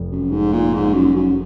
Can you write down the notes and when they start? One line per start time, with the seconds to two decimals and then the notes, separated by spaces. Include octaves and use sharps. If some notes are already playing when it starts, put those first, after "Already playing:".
Already playing: F1 F2
0.11 F#2
0.31 G#2
0.53 A#2
0.74 G#2
0.94 F#2
1.16 F#2